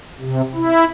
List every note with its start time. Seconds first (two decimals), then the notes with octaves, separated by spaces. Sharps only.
0.20 C3
0.54 E4